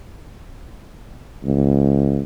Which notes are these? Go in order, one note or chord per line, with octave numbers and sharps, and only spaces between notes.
C#2